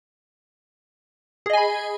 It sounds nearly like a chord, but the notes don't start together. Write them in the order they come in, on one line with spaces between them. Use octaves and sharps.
G#4 D#5 G#5 B5